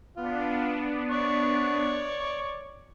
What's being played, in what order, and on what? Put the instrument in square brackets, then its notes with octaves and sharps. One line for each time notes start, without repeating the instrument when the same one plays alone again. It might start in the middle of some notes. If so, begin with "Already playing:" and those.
[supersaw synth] B3 D4 [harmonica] F4
[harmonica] C#5 D5 C#6